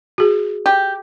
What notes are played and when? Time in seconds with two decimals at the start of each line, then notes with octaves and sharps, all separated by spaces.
0.18 F#4 G#4
0.66 G4